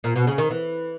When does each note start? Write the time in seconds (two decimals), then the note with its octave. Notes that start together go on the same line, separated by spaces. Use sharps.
0.04 A#2
0.16 B2
0.27 C#3
0.38 D#3
0.51 E3